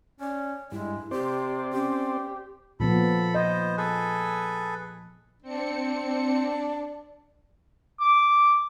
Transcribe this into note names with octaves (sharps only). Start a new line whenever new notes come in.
C#4 D5
G2 G#3 E4
C3 C4 G4 C5 D5
C#4 G4
A#2 F3 B3 A4 B5
B3 C5 D#5
G#4 A4 B4
C4 D4 C#7
D6